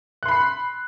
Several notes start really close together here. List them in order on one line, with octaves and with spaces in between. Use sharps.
F#6 C6 B5 C7